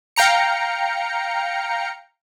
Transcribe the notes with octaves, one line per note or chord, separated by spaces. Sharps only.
F5 G5 A#5 C#7